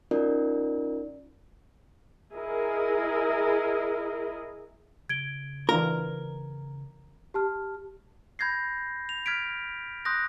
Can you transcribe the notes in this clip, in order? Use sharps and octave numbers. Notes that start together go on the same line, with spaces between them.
C#4 D#4 F4 A#4 D5
E4 G#4 A#4 D#5
C#3 G#6 D7 G7
E3 D4 F4 A#4
G4 A5 F6
B5 G6 G#6 A#6 C7
F7
F6 G#6 B6 D7
C6 D#6 F#6 G6 A#6